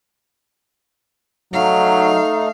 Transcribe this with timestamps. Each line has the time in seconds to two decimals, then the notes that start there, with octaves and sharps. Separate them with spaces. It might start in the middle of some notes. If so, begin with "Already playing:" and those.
1.53 F#3 A3 D#4 F5